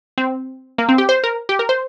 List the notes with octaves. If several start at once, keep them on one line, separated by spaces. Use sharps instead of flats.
C4
A#3
C4
G4
C5
A#4
G4
A#4
C5